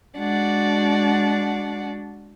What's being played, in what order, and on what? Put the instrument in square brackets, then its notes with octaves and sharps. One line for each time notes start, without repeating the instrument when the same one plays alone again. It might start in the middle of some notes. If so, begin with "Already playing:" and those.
[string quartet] G#3 D4 F#4 D5 F#5